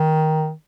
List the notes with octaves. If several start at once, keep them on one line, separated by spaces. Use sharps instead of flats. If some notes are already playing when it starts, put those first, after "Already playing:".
Already playing: D#3